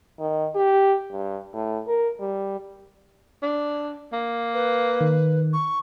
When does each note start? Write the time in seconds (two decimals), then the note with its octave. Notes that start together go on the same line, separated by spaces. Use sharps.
0.19 D#3
0.55 G4
1.11 G2
1.54 A2
1.87 A#4
2.20 G3
3.43 D4
4.13 A#3
4.54 B4
5.01 D#3
5.53 C#6